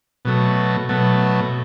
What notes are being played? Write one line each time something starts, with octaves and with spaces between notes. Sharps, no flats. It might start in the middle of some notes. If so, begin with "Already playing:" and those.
B2 F#3 A3
B2 F#3 A3